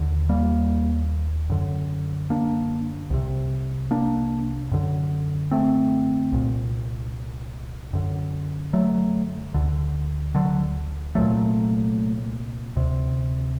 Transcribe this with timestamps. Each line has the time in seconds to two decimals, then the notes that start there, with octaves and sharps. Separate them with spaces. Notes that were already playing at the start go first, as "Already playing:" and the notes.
Already playing: D#2 D3
0.29 G3 A#3
1.50 F#2 D3
2.30 A#3 D4
3.10 C2 C3
3.91 A#3 D4
4.72 F#2 D3
5.51 A3 C4
6.32 C2 A#2
7.93 F#2 D3
8.73 F#3 A3
9.54 D2 D3
10.35 D3 F#3
11.15 C2 A#2 F#3 A3
12.76 D2 C3